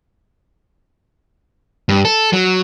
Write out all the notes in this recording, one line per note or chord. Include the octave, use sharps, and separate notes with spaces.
G2
A4
F#3